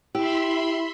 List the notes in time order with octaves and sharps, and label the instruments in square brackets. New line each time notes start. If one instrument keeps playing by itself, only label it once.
[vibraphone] E4 [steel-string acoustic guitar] G4 [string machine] E5 B5 C6